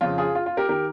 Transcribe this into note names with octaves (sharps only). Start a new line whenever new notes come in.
F2 C#3 F4
F4 G#4
F4
F4
G4 A#4
D#3 G4 A#4